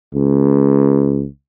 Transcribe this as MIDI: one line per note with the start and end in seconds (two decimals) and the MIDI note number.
0.15 1.27 37